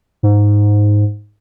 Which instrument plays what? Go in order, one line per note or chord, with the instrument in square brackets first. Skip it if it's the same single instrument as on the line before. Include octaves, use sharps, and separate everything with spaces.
[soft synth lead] G#2